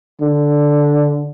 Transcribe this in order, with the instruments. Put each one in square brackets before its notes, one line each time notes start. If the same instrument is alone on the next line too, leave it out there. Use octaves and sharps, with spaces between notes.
[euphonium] D3